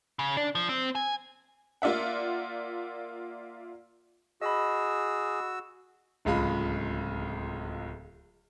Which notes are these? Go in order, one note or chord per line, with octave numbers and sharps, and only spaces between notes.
C#3
D4
F3
C4
G#5
A#3 F4 D5 E5 F#5
F#4 G#4 D#5 B5 E6
D1 C#2 G#3 F4 B5